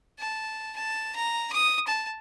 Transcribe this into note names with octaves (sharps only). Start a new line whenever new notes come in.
A5
A5
A#5
D#6
A5